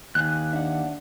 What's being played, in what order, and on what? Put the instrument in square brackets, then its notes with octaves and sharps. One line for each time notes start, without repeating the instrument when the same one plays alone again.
[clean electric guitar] D#2 [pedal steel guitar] G#5 F#6
[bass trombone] D4 [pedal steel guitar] E5 F#5